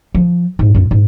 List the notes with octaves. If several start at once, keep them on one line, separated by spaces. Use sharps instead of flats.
F3
G#2
F#2 F4
G#2